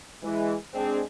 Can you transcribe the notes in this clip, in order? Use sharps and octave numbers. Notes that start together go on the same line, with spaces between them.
E3 G#3
G#3 C4 D4 G#4